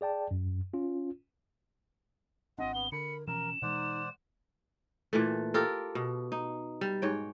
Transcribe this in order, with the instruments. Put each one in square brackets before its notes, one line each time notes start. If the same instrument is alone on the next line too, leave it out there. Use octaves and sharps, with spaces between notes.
[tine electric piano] G#4 D5 G5 A5
F#2
C#4 F4
[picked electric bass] G#1 C4 D4 [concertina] F4 [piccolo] D#5 [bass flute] F#5
[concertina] B3 [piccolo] G7
[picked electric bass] D3 [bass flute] A#4 [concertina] B5 [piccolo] C#7
[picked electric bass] B2 E3 F3 [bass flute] C#4 [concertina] A#4 [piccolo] E7
[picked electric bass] B2 E3 G#3 [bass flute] D#4 [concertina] C5 D5 F#5
[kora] A#2 E3 A3
F4 G4 A4 A#4
B2
D#4
G3
G#2 C#5 G5